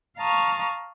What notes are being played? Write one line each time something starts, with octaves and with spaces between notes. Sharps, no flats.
F5 A5 A#5 C#6 D#6 F6